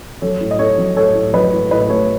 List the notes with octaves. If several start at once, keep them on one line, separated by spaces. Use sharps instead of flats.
F#3 A4 C#5
A2
D#5
A2 A4 C#5
F#3
A2 A4 C#5
A2
F#3 B4 D#5
A2
A2 B4 D#5
A3 A4 C#5